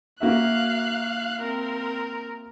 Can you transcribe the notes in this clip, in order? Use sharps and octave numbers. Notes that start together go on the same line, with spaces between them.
A#3 F#4 E5 F5 F#6
C4 A#4